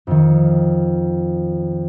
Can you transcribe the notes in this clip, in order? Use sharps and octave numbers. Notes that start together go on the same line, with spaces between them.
F2 D#3